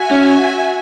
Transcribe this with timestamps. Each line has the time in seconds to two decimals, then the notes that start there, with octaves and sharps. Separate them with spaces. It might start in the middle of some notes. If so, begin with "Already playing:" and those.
Already playing: F#4 E5 G#5
0.11 C#4